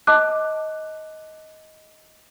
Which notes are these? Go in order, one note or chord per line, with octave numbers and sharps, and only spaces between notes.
D#5 A5 D6 F#6